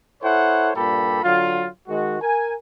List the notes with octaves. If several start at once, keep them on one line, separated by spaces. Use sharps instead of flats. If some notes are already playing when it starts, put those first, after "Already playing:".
E4 A4 C5 C#5 F#5
G2 A#2 G4 A4 B5
D3 F#3 F4
D#3 G#3 F#4
A#4 G#5